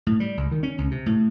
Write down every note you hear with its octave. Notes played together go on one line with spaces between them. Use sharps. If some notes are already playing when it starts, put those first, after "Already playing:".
A2
G3
C#2
D#3
C#4
C#2
C3
A2